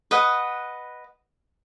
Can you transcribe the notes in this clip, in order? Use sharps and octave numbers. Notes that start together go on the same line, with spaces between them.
B4 D#5 F#5